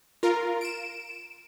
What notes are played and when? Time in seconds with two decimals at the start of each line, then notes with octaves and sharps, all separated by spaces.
0.23 F4 A#4
0.61 D7 E7